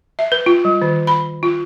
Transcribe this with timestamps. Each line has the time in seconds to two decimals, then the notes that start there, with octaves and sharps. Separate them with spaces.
0.19 E5
0.32 B4
0.46 F4
0.65 G3
0.82 D#3
1.07 B5
1.43 F4